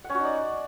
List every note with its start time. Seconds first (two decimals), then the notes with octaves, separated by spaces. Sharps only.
0.04 F#5
0.10 C#4
0.15 F#4
0.20 D#4
0.25 D5